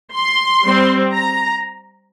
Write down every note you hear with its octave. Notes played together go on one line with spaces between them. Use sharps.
C6
G3 C4
A#5